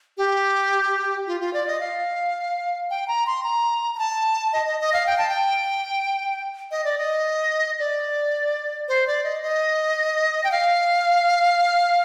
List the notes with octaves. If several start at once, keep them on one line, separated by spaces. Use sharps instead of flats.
G4
F4
F4
D5
D#5
F5
G5
A#5
C6
A#5
A#5
A5
D#5
D#5
D#5
F5
G5
A5
G5
D#5
D5
D#5
D5
C5
D5
D#5
D#5
G5
F5